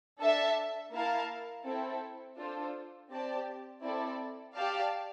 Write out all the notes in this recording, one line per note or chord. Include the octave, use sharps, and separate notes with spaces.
D4 A4 E5 A5
A#3 E4 A#4 F5 A5
C4 E4 A4
D4 F4 A4 C5
C4 G4 D5 A5
C4 E4 A4 D5
G4 D5 F5 A5